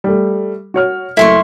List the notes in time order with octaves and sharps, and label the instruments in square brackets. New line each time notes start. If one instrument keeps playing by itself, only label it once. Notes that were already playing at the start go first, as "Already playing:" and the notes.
[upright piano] G3 A3
F#4 C#5 F6
[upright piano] F#1 A3 [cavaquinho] E4 C6 C#6